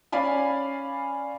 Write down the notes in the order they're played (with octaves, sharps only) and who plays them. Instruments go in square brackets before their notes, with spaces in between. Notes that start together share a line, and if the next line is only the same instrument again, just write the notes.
[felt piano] C#4 D5 F5 G#5 B5